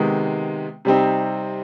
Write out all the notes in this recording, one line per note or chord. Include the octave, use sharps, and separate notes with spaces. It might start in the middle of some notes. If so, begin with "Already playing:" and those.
Already playing: C3 D#3 G#3 B3
C3 G3 C4 D#4